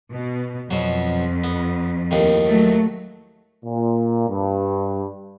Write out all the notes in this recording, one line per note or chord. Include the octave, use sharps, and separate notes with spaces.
B2
F2 B2 F#3
B3
D#2 A2 D#3
F#3 A3
A#2
G2